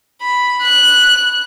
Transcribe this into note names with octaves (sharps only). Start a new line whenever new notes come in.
B5
F#6